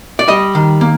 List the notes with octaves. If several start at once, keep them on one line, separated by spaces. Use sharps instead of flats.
D5
G3 D#5
D#3
A#3